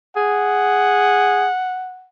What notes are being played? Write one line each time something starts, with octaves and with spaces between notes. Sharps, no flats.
G#4 F#5